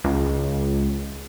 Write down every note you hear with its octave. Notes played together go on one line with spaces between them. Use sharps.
C#2